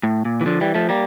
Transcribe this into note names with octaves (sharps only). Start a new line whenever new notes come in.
A2
A#2
E3
D3 F3
E3 G3
F3 A3
G3 A#3